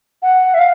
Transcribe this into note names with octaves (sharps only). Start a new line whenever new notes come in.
F#5
E5
F5